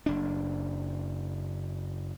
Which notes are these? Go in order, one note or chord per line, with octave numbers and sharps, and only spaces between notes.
F#1 D4